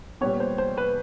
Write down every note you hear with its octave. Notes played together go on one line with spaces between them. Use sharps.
A#2 G3 B3 C#5
C5
C5
B4